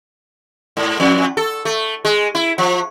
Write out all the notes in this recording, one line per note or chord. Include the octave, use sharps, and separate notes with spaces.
G#2
F2
A4
A3
G#3
E4
F3